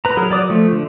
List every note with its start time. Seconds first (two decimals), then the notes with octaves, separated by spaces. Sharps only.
0.05 B4 A#5
0.17 F#3 G#4 A#4
0.30 F#3 D5 D6 D#6
0.50 F3 A3
0.72 D3